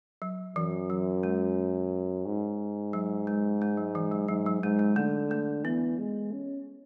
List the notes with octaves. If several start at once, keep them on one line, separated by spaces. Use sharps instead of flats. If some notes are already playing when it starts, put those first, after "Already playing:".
F#3
F#2 E3
F#3
G#3
G#2
F#3
G#3
G#3
F#3
E3
F#3
G#2 F#3
F#3
G#2 G#3
G#3
D3 A3
A3
E3 B3
G#3
C#4